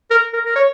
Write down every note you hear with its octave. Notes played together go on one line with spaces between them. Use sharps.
A#4
A#4
A#4
C#5